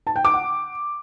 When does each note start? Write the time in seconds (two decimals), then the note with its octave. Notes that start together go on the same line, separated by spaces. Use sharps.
0.07 A5
0.16 G5
0.25 D6
0.34 F#5